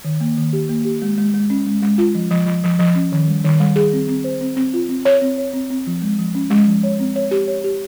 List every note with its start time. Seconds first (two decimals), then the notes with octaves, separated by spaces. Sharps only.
0.04 D#3
0.21 A#3
0.37 D#3
0.53 G4
0.69 A#3
0.85 G4
1.02 G#3
1.18 G#3
1.34 G#3
1.50 C#4
1.66 G#3
1.82 G#3
1.98 F4
2.15 F3
2.31 F3
2.46 F3
2.64 F3
2.79 F3
2.95 C#4
3.12 D#3
3.28 G3
3.44 D#3
3.60 G3
3.76 G#4
3.93 C4
4.08 C4
4.24 C5
4.41 C4
4.57 C4
4.74 F4
4.89 C4
5.05 C#5
5.22 C4
5.38 C#5
5.53 C4
5.70 C4
5.87 F3
6.02 G#3
6.19 F3
6.35 C#4
6.50 G#3
6.67 F3
6.83 C#5
6.99 C4
7.16 C#5
7.31 G4
7.48 C#5
7.64 G4